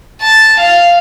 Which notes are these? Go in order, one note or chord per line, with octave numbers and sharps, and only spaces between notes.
A5
F5